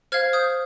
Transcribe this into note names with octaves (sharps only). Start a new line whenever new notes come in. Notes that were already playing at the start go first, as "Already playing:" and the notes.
C5 F5 F6 G#6
D#6 G6